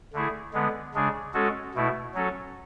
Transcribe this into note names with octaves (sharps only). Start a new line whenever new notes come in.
D3 A3 E4 G#4
D3 G#3 B3
C#3 G#3 D4 G#4
G#3 C#4 F#4 A4
B2 A3 E4
F#3 C#4 F#4 A4